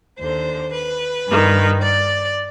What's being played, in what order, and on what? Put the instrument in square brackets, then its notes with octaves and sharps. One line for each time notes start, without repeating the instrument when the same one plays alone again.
[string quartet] D#2 D3 C5
B4
G2 D#3
D5